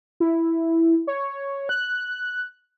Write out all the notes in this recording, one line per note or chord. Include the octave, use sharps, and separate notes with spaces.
E4
C#5
F#6